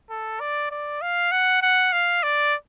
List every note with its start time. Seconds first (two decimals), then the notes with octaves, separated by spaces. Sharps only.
0.10 A4
0.40 D5
0.71 D5
1.02 F5
1.32 F#5
1.62 F#5
1.93 F5
2.23 D5